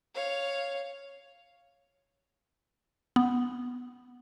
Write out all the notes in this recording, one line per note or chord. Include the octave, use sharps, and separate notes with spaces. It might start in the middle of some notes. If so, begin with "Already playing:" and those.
C#5 F5
B3